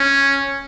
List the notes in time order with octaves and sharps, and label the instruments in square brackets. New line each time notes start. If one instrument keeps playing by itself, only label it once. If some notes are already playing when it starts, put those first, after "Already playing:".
Already playing: [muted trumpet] C#4